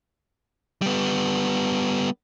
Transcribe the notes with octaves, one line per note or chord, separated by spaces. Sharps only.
G3 B3